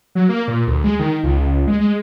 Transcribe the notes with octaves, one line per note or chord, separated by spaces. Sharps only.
F#3
A#3
A#2
D2
G#3
D#3
C#2
G#3
G#3